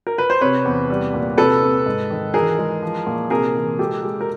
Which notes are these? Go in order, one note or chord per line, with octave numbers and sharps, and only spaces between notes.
A#4
B4
C5
C3 B4 C#5
E2
G3
A#2
C3 A4 B4
C3
G#2
D#3
E3 G#4 A#4
G#3
F3
A#2
C3 G#4 A#4
E3
G#3 G4 A4
G#3
A#4